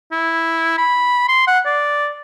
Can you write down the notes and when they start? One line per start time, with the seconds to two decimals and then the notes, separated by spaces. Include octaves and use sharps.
0.12 E4
0.78 B5
1.28 C6
1.47 F#5
1.66 D5